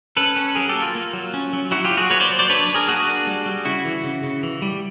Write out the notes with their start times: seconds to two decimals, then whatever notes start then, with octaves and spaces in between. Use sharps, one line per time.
0.17 C#4 A4 B4
0.36 C#4
0.55 F#3 G#4 A#4
0.69 G4 A4
0.76 A#3
0.82 F4
0.95 A#3
1.13 F#3
1.34 C#4
1.53 F#3
1.71 F#3 E4 F#4
1.84 F4 G4
1.91 F#3
1.97 F#4 G#4
2.10 A#3 B4 C#5
2.20 C5 D5
2.30 F#3
2.39 C5 D5
2.50 D4 B4 C#5
2.69 D4
2.74 G#4 A#4
2.88 A#3 F#4 G#4
3.08 D4
3.27 G3
3.46 G3
3.65 C#3 E4 F#4
3.85 E3
4.04 C#3
4.23 C#3
4.43 E3
4.62 G3